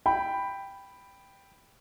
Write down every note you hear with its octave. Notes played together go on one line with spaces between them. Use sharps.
G5 B5